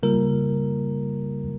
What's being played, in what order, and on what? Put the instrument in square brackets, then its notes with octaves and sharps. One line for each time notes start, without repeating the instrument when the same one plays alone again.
[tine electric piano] C#3 G3 A#3 F4 A#4